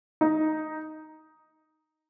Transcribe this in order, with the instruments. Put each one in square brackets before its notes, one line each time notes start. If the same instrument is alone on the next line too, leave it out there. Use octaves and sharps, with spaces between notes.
[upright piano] D#4